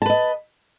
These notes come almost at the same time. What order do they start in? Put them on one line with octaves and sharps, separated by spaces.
A5 B4 D#5